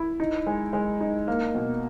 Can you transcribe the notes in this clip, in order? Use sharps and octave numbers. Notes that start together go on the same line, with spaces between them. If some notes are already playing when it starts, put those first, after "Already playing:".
Already playing: E4
D#4
G#3
G#3
D#4
A#3
B2